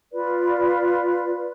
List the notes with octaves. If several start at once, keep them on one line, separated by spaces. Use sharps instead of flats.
F4 B4 D5